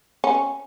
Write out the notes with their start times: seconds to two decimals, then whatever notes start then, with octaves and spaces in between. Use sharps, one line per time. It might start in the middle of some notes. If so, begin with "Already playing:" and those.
0.24 C#4